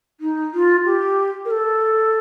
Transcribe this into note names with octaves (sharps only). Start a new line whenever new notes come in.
D#4
F4
G4
A#4
A4